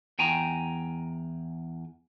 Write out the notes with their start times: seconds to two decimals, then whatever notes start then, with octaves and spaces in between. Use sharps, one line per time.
0.19 E2 G5 G#5 A#5